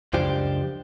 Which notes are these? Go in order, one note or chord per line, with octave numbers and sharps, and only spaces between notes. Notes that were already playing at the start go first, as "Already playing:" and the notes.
C#2 F#2 F3 D4 G4 C5